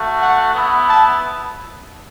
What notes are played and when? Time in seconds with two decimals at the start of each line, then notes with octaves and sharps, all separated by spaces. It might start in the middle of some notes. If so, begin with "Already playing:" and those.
Already playing: A3 F#4
0.20 F#5
0.53 B3 E4
0.88 A5